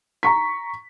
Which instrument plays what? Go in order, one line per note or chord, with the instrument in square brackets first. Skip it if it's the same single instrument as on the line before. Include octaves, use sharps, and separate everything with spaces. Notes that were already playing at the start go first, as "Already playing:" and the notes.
[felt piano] A#5 C#6 B6